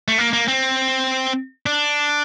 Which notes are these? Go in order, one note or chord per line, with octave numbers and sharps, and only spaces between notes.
A3
A#3
A#3
C4
D4